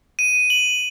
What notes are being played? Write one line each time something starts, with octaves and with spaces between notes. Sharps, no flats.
D#7
F#7